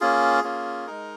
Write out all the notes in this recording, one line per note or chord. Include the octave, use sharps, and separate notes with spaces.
A#3 C#4 F4 G#4
A#3 C#4 F4
G#3 D#4 A#4